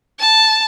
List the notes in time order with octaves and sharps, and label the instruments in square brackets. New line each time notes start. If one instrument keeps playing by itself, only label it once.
[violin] A5